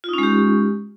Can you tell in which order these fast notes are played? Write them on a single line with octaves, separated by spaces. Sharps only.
F4 D#4 C#4 G#3 G4